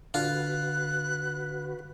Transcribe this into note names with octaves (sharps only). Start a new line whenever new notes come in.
D3 F4 F#4 B4 F#6